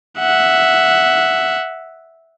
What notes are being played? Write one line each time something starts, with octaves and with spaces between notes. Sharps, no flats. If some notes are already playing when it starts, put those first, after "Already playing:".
E5 F#5